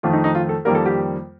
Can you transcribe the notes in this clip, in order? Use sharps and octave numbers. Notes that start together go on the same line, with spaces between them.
F2 D#3 A3 F4
D#4
D#4
F4
A4
F2 D#3 G3 A#3 A#4
A4
G4